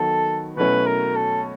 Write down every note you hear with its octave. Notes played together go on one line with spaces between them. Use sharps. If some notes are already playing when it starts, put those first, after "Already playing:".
Already playing: D#3 F#3 B3 A4
B2 F#3 A3 C#4 E4 B4
A#4
A4